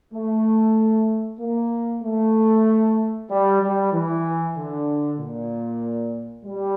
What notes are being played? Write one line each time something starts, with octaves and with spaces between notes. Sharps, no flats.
A3
A#3
A3
G3
G3
E3
D3
A#2
G3